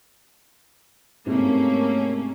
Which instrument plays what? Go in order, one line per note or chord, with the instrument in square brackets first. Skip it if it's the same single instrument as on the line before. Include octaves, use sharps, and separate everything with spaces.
[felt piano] G#2 C3 [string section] A3 A#3 C#4